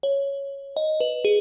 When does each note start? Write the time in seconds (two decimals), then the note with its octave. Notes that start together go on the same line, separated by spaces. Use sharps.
0.03 C#5
0.77 D#5
1.00 B4
1.25 G#4